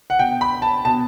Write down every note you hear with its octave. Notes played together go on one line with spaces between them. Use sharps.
F#5
B2 G5
B5
A5
B2 A5